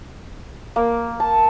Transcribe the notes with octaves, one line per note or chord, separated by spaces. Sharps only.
A#3
A5